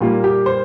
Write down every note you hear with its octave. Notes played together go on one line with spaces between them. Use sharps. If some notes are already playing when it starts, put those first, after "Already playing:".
A#2 G3 A#3 F4
G4
C5